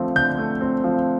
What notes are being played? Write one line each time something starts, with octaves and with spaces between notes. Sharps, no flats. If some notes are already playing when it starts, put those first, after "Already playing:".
Already playing: D3 F3 A3 C4
D3 G6
A3
C4
F3